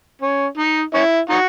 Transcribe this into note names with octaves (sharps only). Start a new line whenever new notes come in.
C#4
D#4
C#4 E4
D#4 F#4